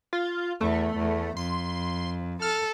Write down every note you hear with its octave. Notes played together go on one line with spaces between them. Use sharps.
F4
E2 A3
E2
F2 C6
A4 F6